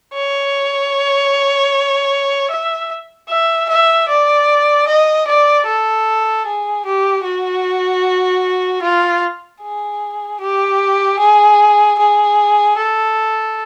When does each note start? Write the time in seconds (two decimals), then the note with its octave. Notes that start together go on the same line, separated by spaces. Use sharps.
0.14 C#5
2.50 E5
3.29 E5
3.69 E5
4.08 D5
4.87 D#5
5.27 D5
5.66 A4
6.46 G#4
6.85 G4
7.24 F#4
8.82 F4
9.62 G#4
10.40 G4
11.19 G#4
11.99 G#4
12.77 A4